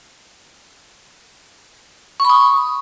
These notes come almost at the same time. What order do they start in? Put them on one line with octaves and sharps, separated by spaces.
C#6 B5 D#6